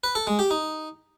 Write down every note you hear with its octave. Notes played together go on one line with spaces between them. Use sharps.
B4
A4
G#3
G4
D#4